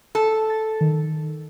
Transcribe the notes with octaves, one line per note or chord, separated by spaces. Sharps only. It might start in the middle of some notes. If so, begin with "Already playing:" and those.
A4
A6
D#3